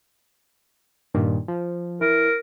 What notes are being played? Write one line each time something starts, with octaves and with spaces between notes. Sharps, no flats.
G2 A#2 D#3
F3
E3 A#4